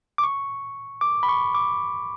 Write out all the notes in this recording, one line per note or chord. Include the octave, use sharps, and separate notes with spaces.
D6
C#6
D6
B5
C#6
D6